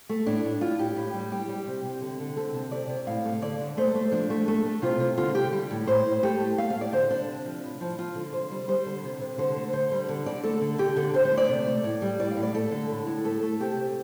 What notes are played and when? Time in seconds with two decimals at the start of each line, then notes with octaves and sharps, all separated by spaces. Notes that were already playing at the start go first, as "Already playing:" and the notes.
0.09 A3
0.26 A2 D4
0.44 A2
0.61 A2 F4
0.79 A2 G4
0.96 A2
1.14 G3
1.31 G3 G4
1.49 G3
1.67 C3
1.85 C3
2.01 D3
2.20 D3
2.36 C3 A4
2.54 C3
2.71 C3 D5
2.89 C3
3.07 A2 F5
3.25 A3
3.42 D3 D5
3.60 D3
3.77 A3 C5
3.95 A3
4.12 F3 D4
4.30 A3
4.48 A3
4.65 A3
4.82 C3 F4
5.00 C3
5.18 D3 F4
5.35 D3 G4
5.53 G3
5.71 A2
5.87 A2 C5
6.05 A2
6.23 A3 G4
6.40 A3
6.58 A3 F5
6.70 F5
6.75 A2
6.81 D5
6.93 D3 C5
7.10 D3 D4
7.28 C3
7.46 F3
7.63 A2
7.81 F3
7.98 F3 F4
8.15 D3
8.33 C3 C5
8.51 G3
8.68 G3 C5
8.86 D3
9.04 C3
9.21 C3
9.38 D3 C5
9.56 A3
9.73 D3 C5
9.92 G3
10.09 D3
10.26 D3 D5
10.43 A3 A4
10.61 D3
10.78 D3 G4
10.97 D3
11.14 D3 C5
11.25 C5
11.32 A3
11.37 D5
11.49 C3
11.67 A3
11.84 A2
12.02 G3
12.20 A2 D5
12.31 F5
12.37 A2
12.43 D5
12.54 A3 A4
12.71 D3
12.90 A2
13.07 A2
13.25 A3 A4
13.43 A3
13.60 C3 G4
13.77 C3